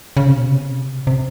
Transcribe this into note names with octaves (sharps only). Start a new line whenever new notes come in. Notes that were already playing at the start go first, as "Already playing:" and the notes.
C#3
C3
B2
C3
C3